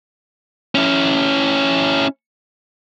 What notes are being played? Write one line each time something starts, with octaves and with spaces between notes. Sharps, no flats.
C#4 E4